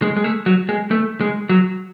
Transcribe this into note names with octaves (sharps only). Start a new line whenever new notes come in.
G#3
G#3
A3
F#3
G#3
A3
G#3
F#3